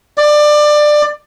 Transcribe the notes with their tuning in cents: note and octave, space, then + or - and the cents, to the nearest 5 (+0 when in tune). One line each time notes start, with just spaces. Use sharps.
D5 +20